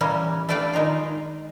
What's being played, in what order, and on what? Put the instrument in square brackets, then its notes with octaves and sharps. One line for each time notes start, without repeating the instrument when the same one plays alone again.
[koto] E3 G3 A#3 C#4
A3 D4 B4 D5 F5 G5
D#3 G#3 D#4 F4